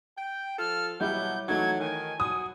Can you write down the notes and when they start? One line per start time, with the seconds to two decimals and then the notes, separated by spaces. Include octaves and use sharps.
0.17 G5
0.59 F3 F4 A4 F6
1.01 B2 F#3 G3 E4 G4 G6
1.49 E3 F#3 A3 D#4 G#6
1.80 D#3 G#5
2.20 F#3 D#6